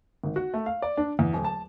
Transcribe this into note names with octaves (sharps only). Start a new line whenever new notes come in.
G#1
F#4
A3
F5
D5
D4
E2
D1
A5